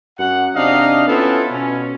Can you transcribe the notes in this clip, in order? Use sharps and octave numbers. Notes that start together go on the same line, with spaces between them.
F#2 F#4 F#5
C3 D4 D#4 D#5 F5
B3 C#4 E4 F4 A4
B2 C#4